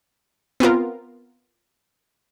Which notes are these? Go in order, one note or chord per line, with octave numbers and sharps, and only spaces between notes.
B3 C4 F4 A#4